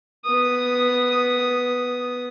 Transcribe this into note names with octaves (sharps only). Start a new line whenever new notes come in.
B3 D#6